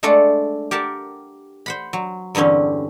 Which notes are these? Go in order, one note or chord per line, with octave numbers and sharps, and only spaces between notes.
G#3 A3 D4 A4 D5 F#5
G4 A#4 F#5 A5
C5 F#5 B5
F#3
E2 G2 D3 C4 C#4